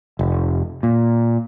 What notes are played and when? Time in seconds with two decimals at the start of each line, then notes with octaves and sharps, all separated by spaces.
0.19 F1
0.83 A#2